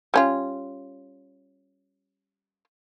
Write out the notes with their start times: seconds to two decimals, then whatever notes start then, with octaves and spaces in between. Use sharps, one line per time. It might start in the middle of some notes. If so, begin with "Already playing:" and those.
0.14 G3 C#4 F4